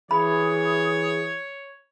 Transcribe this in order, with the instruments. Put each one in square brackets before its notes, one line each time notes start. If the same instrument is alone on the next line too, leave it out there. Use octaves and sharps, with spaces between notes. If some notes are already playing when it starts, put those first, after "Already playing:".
[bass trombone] E3 [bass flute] G#4 [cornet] C#5 [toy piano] B5